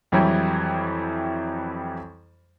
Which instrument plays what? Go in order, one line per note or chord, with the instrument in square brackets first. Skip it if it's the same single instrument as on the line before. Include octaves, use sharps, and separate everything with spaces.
[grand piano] F2 E3 F#3 G3